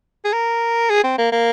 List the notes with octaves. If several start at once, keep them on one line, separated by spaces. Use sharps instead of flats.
G#4
A#4
G#4
C4
A#3
A#3